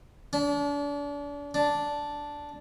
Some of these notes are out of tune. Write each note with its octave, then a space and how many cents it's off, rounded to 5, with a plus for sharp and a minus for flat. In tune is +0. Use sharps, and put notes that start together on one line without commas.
D4 -35
D4 -5